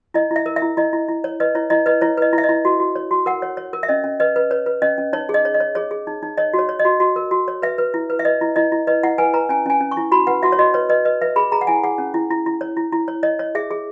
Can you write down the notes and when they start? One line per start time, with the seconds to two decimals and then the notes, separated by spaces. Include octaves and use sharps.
0.14 E4 D#5
0.31 E4 E5
0.46 A#4
0.56 E5
0.62 E4
0.77 E4 D#5
0.93 E4
1.08 E4
1.24 C#5
1.40 B4 D#5
1.55 E4 C#5
1.70 E4 D#5
1.86 B4 D#5
2.01 E4 C#5
2.17 B4 D#5
2.33 E4
2.38 E5
2.44 D#5
2.49 E4
2.65 F#4
2.80 F#4
2.96 C#5
3.11 F#4
3.26 A#4 F#5
3.42 C#5
3.57 C#5
3.73 A#4
3.83 E5
3.89 C#4 D#5
4.04 C#4
4.20 B4 D#5
4.36 B4
4.51 B4 C#5
4.66 B4
4.82 C#4 D#5
4.98 C#4
5.13 D#4 C#5
5.29 G#4
5.34 D#5
5.45 C#5
5.54 D#5
5.60 C#5
5.75 G#4 C#5
5.91 G#4
6.07 D#4
6.23 D#4
6.37 C#5 D#5
6.54 F#4
6.59 C#5
6.69 C#5
6.79 D#5
6.85 F#4
7.00 F#4
7.16 A#4
7.31 F#4
7.48 C#5
7.62 B4 E5
7.78 B4
7.94 E4
8.10 B4
8.19 E5
8.25 B4 D#5
8.41 E4
8.56 E4 D#5
8.72 E4
8.87 B4 D#5
9.04 E4 F#5
9.18 B4 G#5
9.33 B4 A#5
9.49 C#4 G#5
9.66 C#4 G#5
9.81 C#4
9.91 C#6
9.97 E4
10.12 F#4 B5
10.27 B4 F#5
10.43 F#4 E5
10.52 C#5
10.59 F#4 D#5
10.74 B4 C#5
10.89 B4 D#5
11.05 B4 D#5
11.22 B4 E5
11.36 G#4 B5
11.52 G#4 A#5
11.61 F#5
11.67 E4 G#5
11.83 G#4 F#5
11.98 C#4
12.14 E4
12.31 E4
12.46 E4
12.61 C#5
12.77 E4
12.93 E4
13.08 C#5
13.23 C#5 D#5
13.39 C#5
13.55 G#4 E5
13.71 G#4